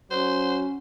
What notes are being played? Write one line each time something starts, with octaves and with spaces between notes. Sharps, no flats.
F#3 C#4 C5